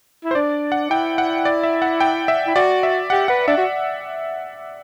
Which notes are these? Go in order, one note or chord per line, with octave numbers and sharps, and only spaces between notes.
E4
C5
D4 D5
F#5
E4 G5
F#5
D5
E5
F#5
G5
E5
E4
F#4 D5
E5
G4 F#5
B4 F#5
D4 E5
F#4